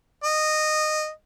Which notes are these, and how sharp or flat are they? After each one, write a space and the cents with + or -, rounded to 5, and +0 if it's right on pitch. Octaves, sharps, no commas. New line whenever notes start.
D#5 -15